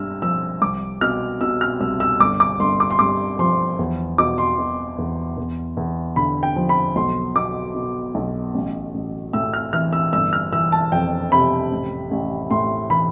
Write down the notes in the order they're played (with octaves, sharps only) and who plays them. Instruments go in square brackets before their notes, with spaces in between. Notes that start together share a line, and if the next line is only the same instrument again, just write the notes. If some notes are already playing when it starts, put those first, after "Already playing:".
Already playing: [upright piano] G2 E6 F6
F3 E6
C2 D6
B2 F6
B2 E6
F6
C2 E6
E6
G1 D6
D6
G1 C6
D6
C6
G2 D6
F3 C6
E2
B2 D6
C6
B2
E2
E2
E2
D3 B5
G5
F3
B5
B1 C6
B2 D6
B2
B1
A1
A1
A2 E6
F6
E3 F6
E6
G1 E6
F6
E3 E6
A5
F2 G5
C3 B5
A1
A1
A2 C6
E3 B5